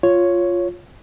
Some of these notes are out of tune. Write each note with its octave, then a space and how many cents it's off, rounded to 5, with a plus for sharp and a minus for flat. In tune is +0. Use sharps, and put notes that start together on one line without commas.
F4 +0 C#5 +0